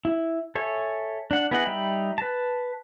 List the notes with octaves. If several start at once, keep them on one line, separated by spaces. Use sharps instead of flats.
E4
A4 C#5 E5 G#5
D4 F#5
B3 E4 G#4 D#5 F#5
G3 D#4 E5 G5 B5
B4 A5